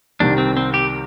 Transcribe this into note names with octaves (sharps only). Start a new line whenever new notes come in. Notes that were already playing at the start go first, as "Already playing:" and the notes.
C2 C3 D#3 G3 D4
C4
C4
G4